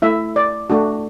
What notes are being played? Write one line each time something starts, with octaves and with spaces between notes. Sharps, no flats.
A3 E4 E5
D5
A3 D4 F#4